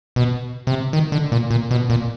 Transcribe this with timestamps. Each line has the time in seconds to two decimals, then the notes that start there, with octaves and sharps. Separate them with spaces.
0.16 B2
0.67 C3
0.93 D#3
1.12 D3
1.32 A#2
1.51 A#2
1.71 B2
1.90 A#2